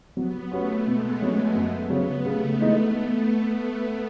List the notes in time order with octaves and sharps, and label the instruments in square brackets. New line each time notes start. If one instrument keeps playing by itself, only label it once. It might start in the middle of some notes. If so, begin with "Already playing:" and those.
[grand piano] F#3 [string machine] B3
[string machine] A3 [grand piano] C#4 F#4 B4
[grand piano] B2 [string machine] G#3
[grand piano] F#3 C#4 [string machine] G#3
[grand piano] F#2 [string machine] A3
[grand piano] C#3 F#3 C#4 [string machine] B3
[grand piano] C#3 [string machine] A3
[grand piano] E3 G#3 D#4